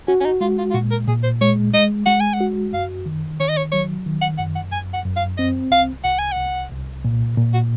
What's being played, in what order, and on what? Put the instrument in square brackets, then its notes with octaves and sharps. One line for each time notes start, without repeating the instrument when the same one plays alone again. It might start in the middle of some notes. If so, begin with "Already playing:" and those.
[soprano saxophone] C#4 [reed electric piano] F#4
[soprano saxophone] C#4
D#4
[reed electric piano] G#3 [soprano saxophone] F4
[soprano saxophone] F4
F4
[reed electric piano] A#2 [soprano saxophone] F#4
[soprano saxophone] A#4
[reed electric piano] A#2 [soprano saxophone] G#4
[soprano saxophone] C5
[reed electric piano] G#3 [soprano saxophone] C#5
[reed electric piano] G#3 [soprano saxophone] D#5
[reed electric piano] G#3 [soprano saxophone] F#5
[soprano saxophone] G#5
F#5
[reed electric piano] F#4
[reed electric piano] F#2 [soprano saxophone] F5
[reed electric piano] D#3
[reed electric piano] D#3 [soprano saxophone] C#5
[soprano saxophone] D#5
C#5
[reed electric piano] F#3 [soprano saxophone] C#5
[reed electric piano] D#3
[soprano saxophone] F#5
[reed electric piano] F#2 [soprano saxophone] F#5
[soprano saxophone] F#5
[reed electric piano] F#2 [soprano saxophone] G#5
[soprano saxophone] F#5
[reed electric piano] F#2
[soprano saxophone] F5
[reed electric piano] C4 [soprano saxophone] D#5
[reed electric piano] C2 [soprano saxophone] F5
[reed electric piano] C2 [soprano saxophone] F#5
[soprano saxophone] G#5
[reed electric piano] C2 [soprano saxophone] F#5
[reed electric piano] C2
A#2
A#2
[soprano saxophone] F#4